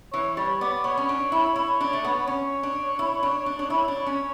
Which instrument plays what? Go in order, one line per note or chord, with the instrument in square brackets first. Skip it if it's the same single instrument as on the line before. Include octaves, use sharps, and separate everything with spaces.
[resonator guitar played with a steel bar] E3 [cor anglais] C#5
[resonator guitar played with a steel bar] G3 [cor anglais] C#5
[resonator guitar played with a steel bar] B3 [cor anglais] D5
[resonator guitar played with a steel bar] B3 [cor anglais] C#5
[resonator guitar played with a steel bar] C#4
D4
E4
E4
D4
A3
B3
[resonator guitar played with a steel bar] C#4 [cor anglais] C#5
[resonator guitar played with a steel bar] D4
E4
D4
D4
D4
[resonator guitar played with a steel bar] E4 [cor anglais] C#5
[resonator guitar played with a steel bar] D4
C#4